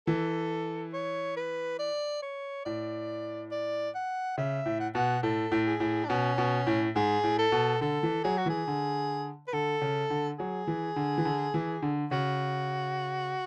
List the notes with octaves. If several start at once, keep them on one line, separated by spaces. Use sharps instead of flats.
E3 A4
C#5
B4
D5
C#5
A2 D5
D5
F#5
C#3 E5
A2
F#5
B2 F#5
A2 A4
A2
G#4
A2
D4
B2 C#4
B2
A2
G#2 G#4
A2
A4
B2
D3 A4
E3
F#3 G#4
F#4
E3 G#4
D3
B4
D3 A4
C#3
D3
F#3 G#4
E3
D3
E3
D3
E3
D3
C#3 F#4